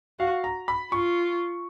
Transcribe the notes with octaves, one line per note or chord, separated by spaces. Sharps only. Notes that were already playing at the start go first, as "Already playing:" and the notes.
F#4 F5
A#5
B5
F4 C#6